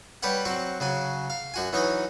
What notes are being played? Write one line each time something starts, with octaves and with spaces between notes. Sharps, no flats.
G3 G4 B4 C#5 F#5
F#3 C4 F#4
C#3 F#3 G#5
F5
F#2 F#4 G#5
E3 F#3 C#4 D#4 C#5 D#5